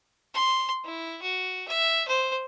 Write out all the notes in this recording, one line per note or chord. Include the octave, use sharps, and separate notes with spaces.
C6
E4
F#4
E5
C5